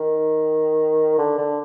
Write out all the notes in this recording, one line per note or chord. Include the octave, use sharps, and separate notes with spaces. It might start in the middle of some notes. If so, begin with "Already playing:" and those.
Already playing: D#3
D3
D3